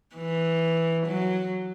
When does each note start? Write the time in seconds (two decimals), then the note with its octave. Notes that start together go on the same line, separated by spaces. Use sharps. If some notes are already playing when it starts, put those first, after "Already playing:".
0.15 E3
1.07 F#3